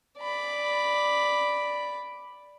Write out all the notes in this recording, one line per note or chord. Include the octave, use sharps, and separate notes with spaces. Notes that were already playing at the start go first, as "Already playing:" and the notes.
D5 B5